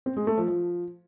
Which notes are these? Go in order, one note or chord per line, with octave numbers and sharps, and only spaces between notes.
C4
G#3
A3
F3
F3